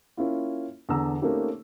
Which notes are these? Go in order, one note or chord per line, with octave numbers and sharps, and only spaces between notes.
A#3 C#4 E4 F4
E2 D3 A5 A#5 E6
A3 A#3 C4 C#4 D#4 G4